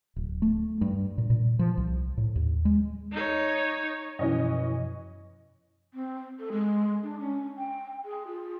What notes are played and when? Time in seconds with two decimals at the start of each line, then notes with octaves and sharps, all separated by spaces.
0.16 D1
0.42 A3
0.81 G2
1.18 A#2
1.30 A#2
1.59 F3
1.77 C2
2.17 A2
2.36 D#2
2.65 G#3
3.12 D#4 C#5
4.19 F#2 B2 E3 F3 C#4 D#5
5.94 C4
6.39 A4
6.52 G#3
7.03 D4
7.20 C#4
7.58 G5
8.05 G#4
8.27 F4